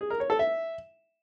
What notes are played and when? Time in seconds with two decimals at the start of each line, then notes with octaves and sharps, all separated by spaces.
0.01 G#4
0.10 A#4
0.20 C#5
0.30 A4
0.39 E5